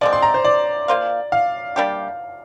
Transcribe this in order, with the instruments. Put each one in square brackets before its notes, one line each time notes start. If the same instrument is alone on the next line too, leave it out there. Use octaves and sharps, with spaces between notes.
[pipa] F3 G#3 C4 [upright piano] D5
[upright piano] C6
A#5
C5
D5
[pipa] A#3 F4 C5 F5
[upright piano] F5
[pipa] G3 A#3 D4 G4